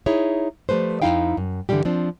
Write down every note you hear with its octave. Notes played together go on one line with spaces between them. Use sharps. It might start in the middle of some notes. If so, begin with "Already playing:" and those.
D#4 E4 G#4 C#5
F3 G3 A3 B4 C5
F2 G#3 D#4 E4 F5 G5
F#2
G2 D3 E3 F3 G3 G4
F3 C4 D4